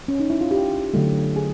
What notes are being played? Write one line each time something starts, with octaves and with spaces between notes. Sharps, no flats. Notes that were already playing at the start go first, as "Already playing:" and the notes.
C#4
D#4
E4
F4
G4
D3 F#3 A3
G#4